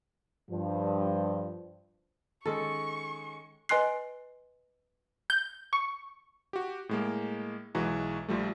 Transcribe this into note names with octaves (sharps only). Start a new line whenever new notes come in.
G2 F3
D#3 G#3 C#4 A4 C#6
B4 D#5 G#5 C6 F#6 C7
G6
C#6
F#4 G4
A2 G#3 A#3
B1 E3 G#3 F#4 A#5
A#1 F3 G3 A3